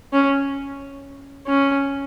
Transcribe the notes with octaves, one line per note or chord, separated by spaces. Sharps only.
C#4
C#4